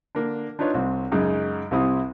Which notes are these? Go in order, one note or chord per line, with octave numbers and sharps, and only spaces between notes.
D3 A#3 D4
D4 D#4 F4 B4 C#5
C2 C4
F#2 C#3 G#3 D#4
C2 C3 C4 E4 D#6